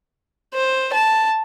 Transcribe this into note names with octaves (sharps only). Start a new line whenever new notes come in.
C5
A5